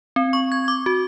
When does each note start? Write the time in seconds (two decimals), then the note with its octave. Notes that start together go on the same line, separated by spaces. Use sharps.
0.16 C4
0.33 C#6
0.52 G#6
0.68 D6
0.86 F#4